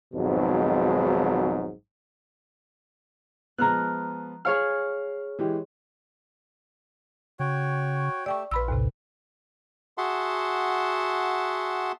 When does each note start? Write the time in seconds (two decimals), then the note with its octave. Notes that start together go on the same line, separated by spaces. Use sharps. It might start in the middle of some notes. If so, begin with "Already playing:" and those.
0.14 G#1 F2 G#2 B2 F#3
3.58 F3 G#3 B3 A#5 F6 F#6
4.45 G#4 C#5 F5 F6
5.39 E3 G#3 G4
7.40 C#3 F#4 C#5 G5
8.26 A3 G4 D5 G5 C#6 E6
8.51 A#1 F4 B4 B5 E6
8.68 D#2 A2 C3
9.98 F#4 G#4 E5 F#5 A5 C6